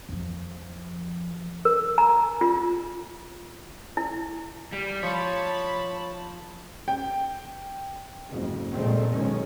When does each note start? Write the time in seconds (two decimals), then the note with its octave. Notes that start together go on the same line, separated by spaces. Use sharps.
0.09 F2 F3
1.65 A#4
1.98 A#5
2.41 F4
3.97 E4
4.72 G3
5.03 F3 C#5 A5 B5
6.88 G5
8.28 F#1 F2 G#2
8.72 F1 A#1 A#2 G#3 A3 C4
9.12 B1 D#3 G#3 C#4